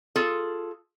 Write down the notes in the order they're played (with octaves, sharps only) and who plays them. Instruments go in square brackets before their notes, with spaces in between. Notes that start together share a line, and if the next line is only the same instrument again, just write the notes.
[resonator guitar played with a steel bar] F4 G#4 A4